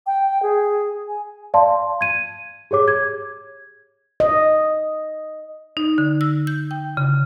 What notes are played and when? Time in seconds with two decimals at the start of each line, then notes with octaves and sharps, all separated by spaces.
0.06 G5
0.43 G#4
1.08 G#5
1.54 D5 F5 A5 C6
2.01 G#6 D#7
2.71 G4 G#4 C#5 D6
2.88 G#6
4.20 D#5
5.77 D#4
5.98 D3
6.21 E6
6.47 G6
6.71 G5
6.97 C#3